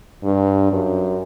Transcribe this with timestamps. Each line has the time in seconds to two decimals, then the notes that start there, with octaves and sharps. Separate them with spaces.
0.24 G2
0.72 F#2